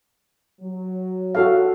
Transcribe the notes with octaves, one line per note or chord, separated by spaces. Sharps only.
F#3
F#4 A4 F5